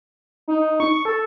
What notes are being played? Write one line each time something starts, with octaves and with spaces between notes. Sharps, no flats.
D#4
C#6
A4